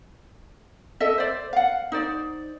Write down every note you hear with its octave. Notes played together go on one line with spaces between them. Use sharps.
A4 D#5 E5
C5 D5
F5 F#5
D#4 C5 D5